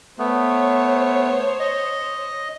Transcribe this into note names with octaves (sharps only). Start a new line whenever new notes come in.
A3 B3 C5 C#5
D#5